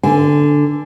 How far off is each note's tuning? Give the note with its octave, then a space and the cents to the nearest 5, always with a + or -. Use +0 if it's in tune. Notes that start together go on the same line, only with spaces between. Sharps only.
D3 +0 B4 -40 G#5 +0